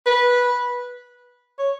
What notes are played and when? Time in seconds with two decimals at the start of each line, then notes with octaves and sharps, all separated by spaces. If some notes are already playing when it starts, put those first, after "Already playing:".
0.07 B4
1.59 C#5